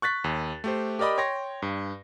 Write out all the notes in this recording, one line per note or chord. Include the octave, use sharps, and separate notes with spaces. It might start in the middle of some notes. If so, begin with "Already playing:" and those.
C#6 F#6 A6 B6
D#2
A3 G4 C5
G4 A#4 D5 D#5 B5
C#5 G5 C6 A#6
G2